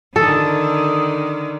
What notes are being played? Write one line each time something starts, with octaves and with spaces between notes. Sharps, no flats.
D3 D#3 A4 D#6